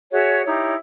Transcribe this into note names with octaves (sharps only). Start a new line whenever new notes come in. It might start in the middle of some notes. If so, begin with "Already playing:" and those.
F#4 G#4 C#5 E5
D#4 E4 G4 C#5